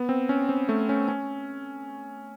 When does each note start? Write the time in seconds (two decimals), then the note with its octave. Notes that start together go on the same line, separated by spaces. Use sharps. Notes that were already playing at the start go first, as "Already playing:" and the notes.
Already playing: B3
0.09 C4
0.29 C#4
0.49 C4
0.69 A3
0.89 C#4
1.08 C#4